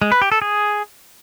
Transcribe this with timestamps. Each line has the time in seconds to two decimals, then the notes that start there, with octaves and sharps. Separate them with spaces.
0.02 G#3
0.12 B4
0.22 G4
0.32 A4
0.42 G#4